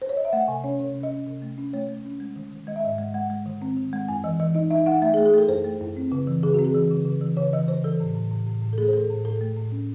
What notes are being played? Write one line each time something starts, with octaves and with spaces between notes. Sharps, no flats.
C5
C#5
D#5
E5
A3 F#5
C3 G#5
C#4 C#5
C3 C#5
C#4
D#5
C#4
C3
A3
C#4
A3 C#5
A3
C#4
G#3
D#3
D#3
G#3 D#5
E5
G#2 D#5
G#3
G#3 F#5
G#3
D#3
C4
D#3
G#3
F#2 G#5
E3 D#5
E3 D#5
D#4 D#5
D#4 E5
D#4 F#5
A3 E5
G#4
A3
G#4
A3 A4
F#2 C5
A3
F#2
C4
C#3
E3
C#3 G#4
C4 F#4
G#4
E3
C#3
C#3
E3
C#3 C#5
E3 D#5
C#3 C5
E3 A4
A2
A2
A2
A2
A2
A4
A3 G#4
C5
A3 A4
A2
A2 A4
A3
A2
C#4